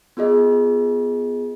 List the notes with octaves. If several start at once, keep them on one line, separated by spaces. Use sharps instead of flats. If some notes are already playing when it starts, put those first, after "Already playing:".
B3 F4 G#4 D#5